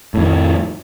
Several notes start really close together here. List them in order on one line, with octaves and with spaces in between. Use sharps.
A2 F2 D#3